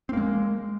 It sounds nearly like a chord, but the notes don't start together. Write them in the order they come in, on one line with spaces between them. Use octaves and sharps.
C4 A#3 G#3